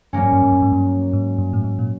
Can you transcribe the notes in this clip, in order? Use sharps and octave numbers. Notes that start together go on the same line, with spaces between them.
G2 F#3 A#3 C#4
G#2
G2
G#2
G2
G#2
G2
G#2
G2
A2
G#2
A#2